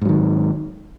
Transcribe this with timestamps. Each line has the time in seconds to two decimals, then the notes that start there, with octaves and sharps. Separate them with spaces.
0.02 G#2
0.05 F#3
0.09 D#3